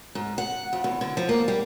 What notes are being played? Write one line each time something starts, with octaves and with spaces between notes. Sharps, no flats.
G#2
F#5
F2
E2
D3
F3
A#3
G3